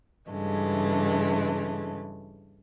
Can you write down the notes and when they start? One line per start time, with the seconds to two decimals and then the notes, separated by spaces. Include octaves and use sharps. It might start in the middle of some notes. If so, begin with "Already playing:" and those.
0.29 G2 C#3 E3 G#3 A3